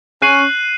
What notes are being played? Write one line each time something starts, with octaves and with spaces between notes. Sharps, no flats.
C#4 F#6 C7 D#7 F#7